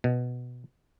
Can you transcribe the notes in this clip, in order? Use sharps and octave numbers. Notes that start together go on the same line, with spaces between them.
B2